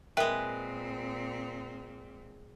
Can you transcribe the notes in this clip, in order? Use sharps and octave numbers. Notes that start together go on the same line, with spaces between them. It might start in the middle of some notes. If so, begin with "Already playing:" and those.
A#2 G#3 C4 A#4 B4 E5 G5